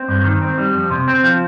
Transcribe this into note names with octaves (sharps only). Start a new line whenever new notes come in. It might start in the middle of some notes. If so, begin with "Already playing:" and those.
Already playing: C4
G2
D#3
C4
G3
F2
C3
C4
F3